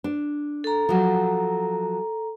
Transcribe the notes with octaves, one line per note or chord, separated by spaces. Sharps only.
D4
A4 A#5
F3 F#3